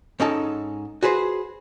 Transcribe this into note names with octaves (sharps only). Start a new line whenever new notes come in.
G#2 C#4 D#4 A4 A5
F#4 G#4 B4 C5